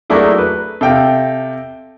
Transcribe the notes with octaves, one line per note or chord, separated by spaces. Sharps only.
F#3 A3 A#3 D4 E4 G#4
B4
C3 A4 F5 G5